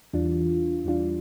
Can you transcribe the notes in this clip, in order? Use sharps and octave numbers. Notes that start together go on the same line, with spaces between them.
E2 E3 G3 D4 F4
E2 E3 G3 D4 F4